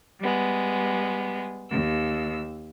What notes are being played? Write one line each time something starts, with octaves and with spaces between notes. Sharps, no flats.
G3 G#3 B3
D#2 E6